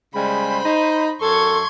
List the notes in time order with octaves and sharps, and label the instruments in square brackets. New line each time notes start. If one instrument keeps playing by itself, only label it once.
[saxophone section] C#3 G3 G#3 [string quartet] C5 B5
[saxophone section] D#4
[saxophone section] F#2 A4 [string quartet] C6 C#6 G#6